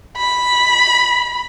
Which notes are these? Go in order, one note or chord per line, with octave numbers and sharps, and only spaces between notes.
B5